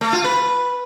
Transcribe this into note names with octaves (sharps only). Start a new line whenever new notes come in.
A3
F4
B4